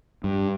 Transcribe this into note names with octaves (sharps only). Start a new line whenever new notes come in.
G2